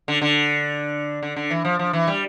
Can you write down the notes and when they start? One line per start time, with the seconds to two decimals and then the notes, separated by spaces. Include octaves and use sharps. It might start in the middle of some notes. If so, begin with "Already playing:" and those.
0.08 D3
0.22 D3
1.23 D3
1.36 D3
1.50 E3
1.65 F3
1.79 F3
1.93 E3
2.07 G3